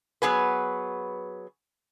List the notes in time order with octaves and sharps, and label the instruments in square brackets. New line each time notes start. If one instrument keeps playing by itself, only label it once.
[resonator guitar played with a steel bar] F#3 B3 G#4 B4